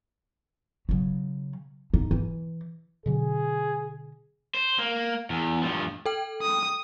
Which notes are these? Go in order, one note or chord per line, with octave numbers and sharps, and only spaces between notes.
C#3 F#3
D#4
E3
B2 D3 F#3 G#4
C5
A#3
E2
G2 F3
A4 G5
D#6